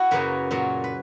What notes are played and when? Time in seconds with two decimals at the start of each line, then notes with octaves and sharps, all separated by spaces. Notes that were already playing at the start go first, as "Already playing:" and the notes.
Already playing: E4 F#4
0.11 F#2 C#3 F#3 A#3 C#4 B4
0.51 A#2 F#3 A#3 C#4
0.84 B4